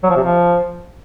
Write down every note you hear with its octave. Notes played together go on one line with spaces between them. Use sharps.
F#3
F3
C3
F3